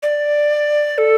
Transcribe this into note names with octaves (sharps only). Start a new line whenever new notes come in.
D5
A4